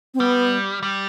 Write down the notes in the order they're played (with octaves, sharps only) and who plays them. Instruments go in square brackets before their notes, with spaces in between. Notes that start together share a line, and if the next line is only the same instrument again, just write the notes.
[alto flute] C4
[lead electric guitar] G3 [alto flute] B3
[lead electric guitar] G3